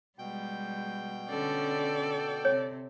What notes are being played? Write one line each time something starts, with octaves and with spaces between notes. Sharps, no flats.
B2 G3 G#3 G5 G6
D3 C#4 A4 D5
C3 C#5